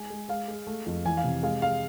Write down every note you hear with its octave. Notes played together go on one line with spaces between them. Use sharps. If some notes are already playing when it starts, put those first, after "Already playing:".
Already playing: G#3 G#5
G#3
G#3 F5
G#3
A3
F2
E3 G#5
F5
C3
G#3 F5
G#3 F5